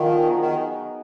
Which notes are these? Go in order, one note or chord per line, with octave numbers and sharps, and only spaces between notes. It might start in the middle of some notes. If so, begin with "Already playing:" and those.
Already playing: D#3 F3 B3 D4 F4 G#4 D5
F#3 B3 D#4 G#4
D#3